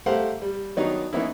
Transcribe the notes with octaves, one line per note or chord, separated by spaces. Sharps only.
A3 G4 A#4 C5 F5 F#5
G3
D#3 F#3 B3 D4 D#4
E3 A#3 B3 C#4 D#4 E4